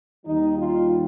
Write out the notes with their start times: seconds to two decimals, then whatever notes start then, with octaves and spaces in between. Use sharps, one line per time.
0.24 D#2 D#3 G3 D#4
0.56 F4